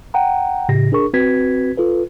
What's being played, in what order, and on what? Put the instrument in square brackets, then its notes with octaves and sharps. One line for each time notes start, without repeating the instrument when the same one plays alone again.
[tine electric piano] F#5 G5 A#5
A2 C#3 G4 A#6
D4 G#4 A#4 C#6
C4 F#4 B4 G#6 B6
F4 A4 B4